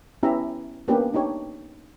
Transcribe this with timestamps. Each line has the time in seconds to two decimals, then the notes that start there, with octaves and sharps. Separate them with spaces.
0.23 B3 C#4 E4 G4 E5 A#5
0.88 A#3 B3 C#4 D4 G4 B4
1.14 D4 D#4 G4 C#5